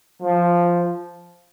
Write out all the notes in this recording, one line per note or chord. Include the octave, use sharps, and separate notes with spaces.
F3